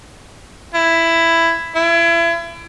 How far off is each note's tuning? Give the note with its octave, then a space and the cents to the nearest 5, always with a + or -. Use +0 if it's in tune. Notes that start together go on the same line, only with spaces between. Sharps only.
E4 +10
E4 +35